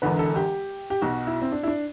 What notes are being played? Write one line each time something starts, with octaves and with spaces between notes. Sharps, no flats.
E1 E2 D3 B4
A4
G4
G4
B1 B2 F#4
E4
C4
D4
E4
D4